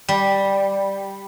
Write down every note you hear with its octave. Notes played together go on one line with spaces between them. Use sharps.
G3